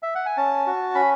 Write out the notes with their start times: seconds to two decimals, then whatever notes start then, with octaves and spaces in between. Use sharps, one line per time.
0.03 E5
0.15 F#5
0.26 G#5
0.37 C#4 A5
0.67 F#4
0.95 C#4 B5